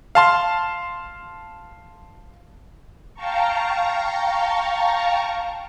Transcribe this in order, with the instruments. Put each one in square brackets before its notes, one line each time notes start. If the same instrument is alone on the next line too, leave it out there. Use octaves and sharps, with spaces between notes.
[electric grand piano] F5 A5 C6
[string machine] F5 G5 A5 A#5 C#6